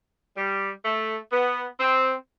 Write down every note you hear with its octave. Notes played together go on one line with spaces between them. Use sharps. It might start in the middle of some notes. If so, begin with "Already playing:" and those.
G3
A3
B3
C4